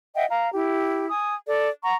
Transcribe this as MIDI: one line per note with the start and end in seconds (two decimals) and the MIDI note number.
0.15 0.24 75
0.15 0.24 76
0.15 0.24 78
0.15 0.24 79
0.29 0.48 77
0.29 0.48 82
0.54 1.06 64
0.54 1.06 67
1.08 1.35 80
1.08 1.35 87
1.46 1.69 69
1.46 1.69 74
1.83 1.94 78
1.83 1.94 82
1.83 1.94 85